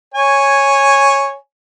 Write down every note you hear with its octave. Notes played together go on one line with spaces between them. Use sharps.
C#5 G#5